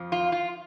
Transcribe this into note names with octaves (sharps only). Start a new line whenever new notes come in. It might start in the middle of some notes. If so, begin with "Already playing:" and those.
Already playing: F2 F3
F4
F4